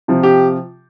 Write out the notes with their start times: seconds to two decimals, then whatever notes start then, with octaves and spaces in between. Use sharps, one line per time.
0.08 C3 F3
0.23 G4